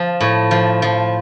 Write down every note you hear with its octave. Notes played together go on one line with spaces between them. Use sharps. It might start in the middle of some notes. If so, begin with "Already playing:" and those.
Already playing: F3
A2
F3
F3